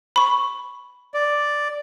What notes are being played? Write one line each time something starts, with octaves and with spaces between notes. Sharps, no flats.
B5 C#6
D5